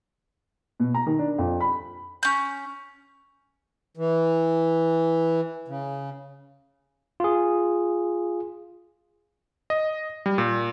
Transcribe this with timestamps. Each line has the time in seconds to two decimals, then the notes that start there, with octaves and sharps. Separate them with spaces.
0.80 B2
0.94 A#5
1.06 D#3
1.19 D4
1.38 F2
1.60 B5
2.23 C#4 G6
3.97 E3
5.68 C#3
7.20 F4 G#4
9.70 D#5
10.26 G3
10.38 A#2